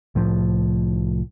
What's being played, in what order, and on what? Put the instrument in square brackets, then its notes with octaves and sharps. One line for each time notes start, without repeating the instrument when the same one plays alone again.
[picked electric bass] C2 A2 F3